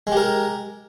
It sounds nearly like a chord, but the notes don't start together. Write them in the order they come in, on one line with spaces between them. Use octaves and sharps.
G#3 G4 A#4